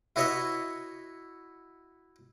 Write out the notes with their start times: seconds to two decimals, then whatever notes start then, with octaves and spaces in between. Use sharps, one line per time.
0.16 E4 F#4 B4 C#5 D#5 E5